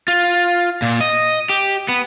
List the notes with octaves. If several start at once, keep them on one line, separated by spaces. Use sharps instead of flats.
F4
A#2
D#5
G4
B3